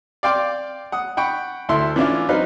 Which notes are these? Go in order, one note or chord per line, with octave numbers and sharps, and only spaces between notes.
D5 F5 G5 C6 D6
F#5 D#6
F#5 G5 B5 C#6
D2 E4 A4 E5 C6
E3 C#4 D4 E4 F4
F#3 C4 D#4 B4 F5